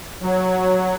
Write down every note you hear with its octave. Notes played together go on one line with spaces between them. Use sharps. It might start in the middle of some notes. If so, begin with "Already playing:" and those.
F#3